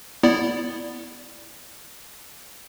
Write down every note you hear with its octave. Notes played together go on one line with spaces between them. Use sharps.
B3 E4 D5